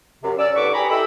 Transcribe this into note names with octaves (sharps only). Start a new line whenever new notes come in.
F#2 C3
C#4 D5 E6
C2 G2 D3 B4 C#6 D6
G4 G#4 G#5 A#5 B5
E4 G4 A4 D#5 B5 E6